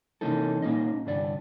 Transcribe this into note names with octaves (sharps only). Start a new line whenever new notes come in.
C3 E3 A#3 C#4 D#4 A4
A#2 A#3 C#4 D#4 D#5
C2 G2 D3 D5